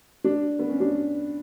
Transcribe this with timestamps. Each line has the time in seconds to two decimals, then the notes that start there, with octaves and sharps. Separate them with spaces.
0.24 D4
0.59 B3
0.69 C#4
0.80 D4